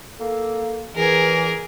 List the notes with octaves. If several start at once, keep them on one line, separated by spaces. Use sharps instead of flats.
A#3 A4
E2 E3 G#4 A#4